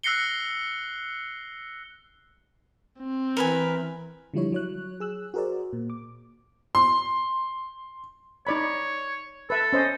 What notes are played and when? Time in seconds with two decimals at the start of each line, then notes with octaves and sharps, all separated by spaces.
0.03 E6 F#6 A#6 C7 C#7 G7
2.99 C4
3.37 E3 A#4 B4 G#5
4.34 D3 F3 G3 E4 C#5
4.52 F#3 C#5 F#6
5.00 G#4 E6 F#6
5.34 F#4 G#4 A#4 C5 D5
5.73 A#2
5.90 D6
6.75 C6
8.47 D#4 C#5 D5 B5
9.50 A4 B4 E5
9.73 C#4 C5 D#5